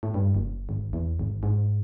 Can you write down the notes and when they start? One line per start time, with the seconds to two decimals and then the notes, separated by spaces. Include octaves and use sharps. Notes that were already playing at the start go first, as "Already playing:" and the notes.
0.03 A2
0.14 G2
0.35 F#1
0.69 G#1
0.93 E2
1.19 G#1
1.43 G#2